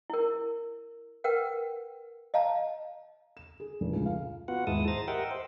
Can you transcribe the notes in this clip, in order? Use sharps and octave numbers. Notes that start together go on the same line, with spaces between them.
E4 A#4
A#4 B4 F#5 G5
D#5 F5 A5 A#5
E7
G#4
F1
C#2
F5
B3 F4 F#4 F#5
D#2 G#2 G#3 E4 A5 D#6
C5 A#5 A6
G4 A#4 D#5 E5 F#5 G5
C5